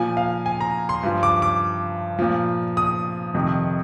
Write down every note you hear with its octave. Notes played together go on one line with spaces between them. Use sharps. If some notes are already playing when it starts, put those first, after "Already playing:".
Already playing: A#2 F3 G#5
F5
G#5
A#5
C6
G2 F3
D6
D6
A#2 F3
D#6
F2 C3 D#3